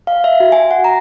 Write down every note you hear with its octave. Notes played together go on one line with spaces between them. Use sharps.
F5
E5
F#4
G#5
F#5
A#5